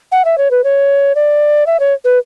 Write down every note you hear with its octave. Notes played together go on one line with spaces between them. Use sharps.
F#5
E5
C#5
B4
C#5
D5
E5
C#5
B4